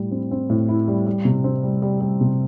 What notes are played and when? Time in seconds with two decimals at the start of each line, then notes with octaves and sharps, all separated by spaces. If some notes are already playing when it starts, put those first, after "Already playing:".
Already playing: A2 G3 E4
0.11 C4
0.31 C4
0.50 A2
0.69 E4
0.88 G3
1.07 G3
1.25 C3
1.44 C4
1.63 G3
1.82 G3
2.01 G3
2.21 C3